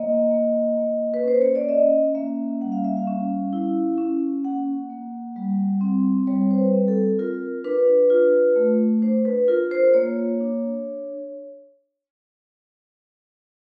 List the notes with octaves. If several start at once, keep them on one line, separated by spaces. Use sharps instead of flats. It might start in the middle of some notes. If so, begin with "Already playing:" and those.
Already playing: A#3 D#5
A#3
A#3
B4
C#4 C5
C#5
D5
C#4 D#5
A#3 E5
G3 F#5
F5
E5
F5
C#4
E4
C#4
A#3 F#5
A#3
G3
C4
G3 C#5
C5
B4
C4
A4
F4 A#4
D4 B4
F4
A3
D4 C5
B4
F4 A#4
C5
A#3 C#5
D4